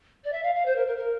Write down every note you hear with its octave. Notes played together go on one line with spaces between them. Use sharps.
D5
E5
F5
F5
C5
A#4
A#4
A#4